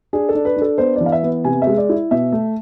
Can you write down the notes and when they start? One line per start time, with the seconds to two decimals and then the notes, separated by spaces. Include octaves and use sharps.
0.13 D4 G#4
0.29 A4
0.35 D4
0.45 B4
0.56 D4
0.62 A4
0.78 B3 C5
0.96 E3 D5
1.06 F5
1.12 E5
1.23 B3
1.44 C3 G#5
1.62 E5
1.67 G#3
1.77 D5
1.89 E4
2.11 B2 E5
2.32 A3